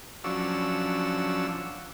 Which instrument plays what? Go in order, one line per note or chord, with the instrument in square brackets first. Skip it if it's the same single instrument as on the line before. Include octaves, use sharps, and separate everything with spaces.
[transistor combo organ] F3 F#3 C#4 D4 E6